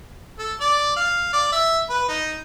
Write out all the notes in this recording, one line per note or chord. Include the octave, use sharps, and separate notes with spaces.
A4
D5
F5
D5
E5
B4
D#4